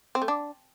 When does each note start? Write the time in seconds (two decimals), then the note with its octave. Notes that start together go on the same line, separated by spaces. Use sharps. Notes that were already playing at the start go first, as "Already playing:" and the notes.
0.15 C4
0.22 A3
0.28 D4